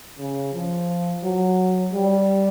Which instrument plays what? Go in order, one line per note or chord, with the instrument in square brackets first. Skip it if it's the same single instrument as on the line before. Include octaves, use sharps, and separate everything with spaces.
[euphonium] C#3
F3
F#3
G3